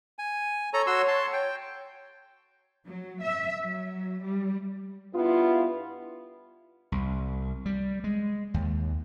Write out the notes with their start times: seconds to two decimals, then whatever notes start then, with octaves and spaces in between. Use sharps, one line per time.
0.19 G#5
0.74 A4 C#5 A#5
0.87 F#4 C6 E6
1.08 A5 C6
1.33 G5
2.87 F#3
3.23 E5
3.62 F#3
4.23 G3
5.14 G2 B3 E4 F4
6.92 C2
7.66 G3
8.04 G#3
8.54 D#2